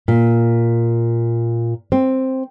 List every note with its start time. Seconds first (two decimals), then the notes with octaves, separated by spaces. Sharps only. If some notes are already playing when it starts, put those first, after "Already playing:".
0.08 A#2
1.92 C4